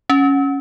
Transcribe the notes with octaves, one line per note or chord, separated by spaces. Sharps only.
C#4